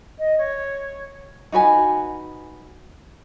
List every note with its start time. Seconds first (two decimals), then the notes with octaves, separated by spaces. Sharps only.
0.19 D#5
0.38 C#5
1.52 D#4 F#4 B4 G#5